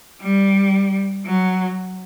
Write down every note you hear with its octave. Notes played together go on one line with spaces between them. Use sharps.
G3
F#3